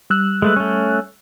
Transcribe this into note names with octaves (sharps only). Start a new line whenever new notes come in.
G3 E6 F#6
G#3 A3 B4
A3 C#4